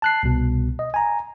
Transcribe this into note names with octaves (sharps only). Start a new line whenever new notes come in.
A5 F#6 C7
C2 B2
D#5
G#5 A#5